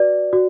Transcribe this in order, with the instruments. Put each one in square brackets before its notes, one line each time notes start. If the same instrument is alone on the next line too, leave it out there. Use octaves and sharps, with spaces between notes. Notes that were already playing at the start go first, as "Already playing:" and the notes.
Already playing: [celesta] F#4 B4 D5
F#4